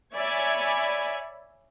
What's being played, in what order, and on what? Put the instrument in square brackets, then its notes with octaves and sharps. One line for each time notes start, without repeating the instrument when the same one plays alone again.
[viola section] C#5 D5 E5 G#5 B5